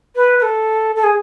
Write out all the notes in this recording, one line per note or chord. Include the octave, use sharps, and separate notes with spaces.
B4
B4
A4
A4
G#4